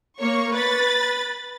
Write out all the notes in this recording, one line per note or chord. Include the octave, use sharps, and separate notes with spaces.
A#3 C#5 C#6
B4 B5 A6